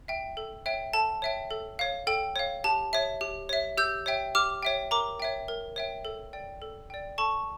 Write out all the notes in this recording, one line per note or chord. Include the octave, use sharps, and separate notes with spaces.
E5 G5
A4
C#5 E5 G5
A4 A5
C#5 E5 G5
A4
C#5 F5
A4 G5
C#5 F5
G4 A5
C#5 E5
G4
C#5 E5
G4 E6 G6
C#5 E5 G5
G4 D6 F6
C#5 E5 G5
A#4 A#5 D6
C#5 E5 G5
A#4
C#5 E5 G5
A4
D5 G5
A4
D5 G5
A4 A5 C#6